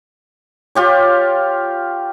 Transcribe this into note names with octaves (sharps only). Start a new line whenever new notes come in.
F4 G4 C#5